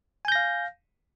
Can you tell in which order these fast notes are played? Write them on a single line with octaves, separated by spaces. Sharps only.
G#5 G6 A#6 F5